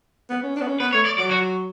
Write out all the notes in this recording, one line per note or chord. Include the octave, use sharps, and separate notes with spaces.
B3
C#4
D4
B3
C#4
B3 B4
A3 C#5
D5
F#3 D5
F#4